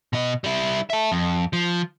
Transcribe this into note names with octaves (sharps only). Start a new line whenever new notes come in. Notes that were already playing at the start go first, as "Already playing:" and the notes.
B2 D#5
G3 E4
E5 A5
F2
F3